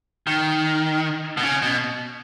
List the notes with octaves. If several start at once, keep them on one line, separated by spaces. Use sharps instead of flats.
D#3
B2
C#3
B2